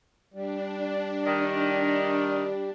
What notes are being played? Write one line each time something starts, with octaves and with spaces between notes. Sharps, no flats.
G3 D4
D#3